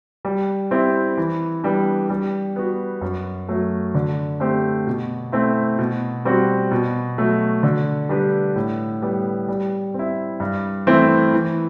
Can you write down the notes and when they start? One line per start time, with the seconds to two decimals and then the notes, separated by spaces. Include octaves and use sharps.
0.25 G3
0.71 C4 E4 G4
1.17 E3
1.63 G3 B3 D4
2.10 G3
2.56 B3 F#4
3.02 F#2
3.48 F#3 A3
3.94 D3
4.40 A3 C4 G4 C5
4.87 B2
5.32 A3 C4 E4
5.79 B2
6.25 G3 C4 F#4
6.71 B2
7.18 F#3 A3
7.63 D3
8.09 G3 D4 G4 B4
8.55 A2
9.02 G3 B3
9.48 G3
9.94 C4 E4
10.40 G2
10.87 E3 A3 C4 E4
11.33 E3